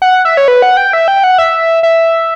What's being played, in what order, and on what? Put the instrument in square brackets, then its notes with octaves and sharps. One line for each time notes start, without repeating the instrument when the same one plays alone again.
[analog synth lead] F#5
E5
C#5
B4
F#5
G5
E5
G5
F#5
E5
E5